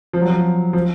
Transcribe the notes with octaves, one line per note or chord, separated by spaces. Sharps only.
F3
F#3
F3
F3